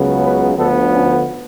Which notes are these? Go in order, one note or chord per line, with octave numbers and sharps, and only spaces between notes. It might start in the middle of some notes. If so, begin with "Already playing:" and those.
Already playing: C#2 C#3 F#3 B3
B4
D2 D3 F3 B3 A4
C#4